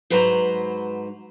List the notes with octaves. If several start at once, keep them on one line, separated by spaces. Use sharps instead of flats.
G#2 F#3 B4 C5 A5 A#5